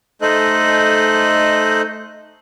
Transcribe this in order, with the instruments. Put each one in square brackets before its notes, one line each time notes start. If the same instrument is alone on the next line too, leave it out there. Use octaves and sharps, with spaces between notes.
[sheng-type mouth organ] A3 D#4 A4 C5 D#5 F#6